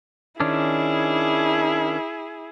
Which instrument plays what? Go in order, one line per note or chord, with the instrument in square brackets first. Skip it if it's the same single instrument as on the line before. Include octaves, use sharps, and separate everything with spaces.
[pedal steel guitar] D#3 C#4 D4 [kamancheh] E4 G#4